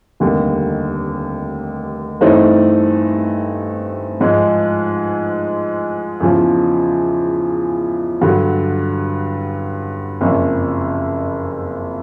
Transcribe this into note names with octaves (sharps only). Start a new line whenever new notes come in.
F1 D#2 D3 G3
G2 E3 A3 C4 D#4
G#2 F3 G#3
E2 C#3 F3
G2 D3 F#3
F#1 F2 C#3